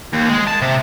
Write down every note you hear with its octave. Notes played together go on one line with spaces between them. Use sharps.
D#2
G#3
A5
C3